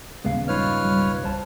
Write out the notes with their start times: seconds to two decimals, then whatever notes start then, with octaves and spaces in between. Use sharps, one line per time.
0.25 D#1 D#2 C#3 G#3 B3 F5
0.48 G2 D#4 F4 B4 C#5 F6
0.85 B1 G3
1.24 C2 C5 A5